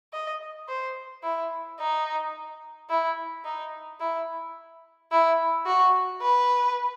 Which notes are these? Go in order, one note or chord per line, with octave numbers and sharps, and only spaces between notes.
D#5
C5
E4
D#4
E4
D#4
E4
E4
F#4
B4